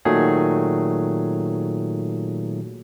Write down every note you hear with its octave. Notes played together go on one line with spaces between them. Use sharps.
A#2 D#3 F#3 A3 G#4